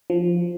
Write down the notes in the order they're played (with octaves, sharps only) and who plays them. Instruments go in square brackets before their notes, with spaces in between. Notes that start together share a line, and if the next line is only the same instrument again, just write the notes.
[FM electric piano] F3